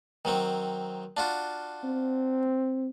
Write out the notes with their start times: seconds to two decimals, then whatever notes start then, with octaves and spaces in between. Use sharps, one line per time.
0.25 D#3 F#3 C4
1.17 D4 F4 F#4
1.84 C4